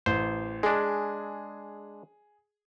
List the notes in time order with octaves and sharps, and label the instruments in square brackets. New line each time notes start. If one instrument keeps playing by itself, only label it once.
[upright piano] A1 [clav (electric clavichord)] C5
[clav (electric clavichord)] G#3 D4 [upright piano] G#4